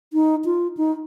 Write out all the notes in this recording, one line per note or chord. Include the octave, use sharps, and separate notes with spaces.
D#4
F4
D#4